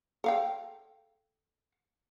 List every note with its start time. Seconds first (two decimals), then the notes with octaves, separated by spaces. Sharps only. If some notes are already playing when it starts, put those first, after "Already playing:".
0.24 A4 F5 G5